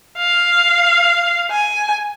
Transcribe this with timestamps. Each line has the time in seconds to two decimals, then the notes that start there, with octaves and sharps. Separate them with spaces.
0.18 F5
1.51 G#5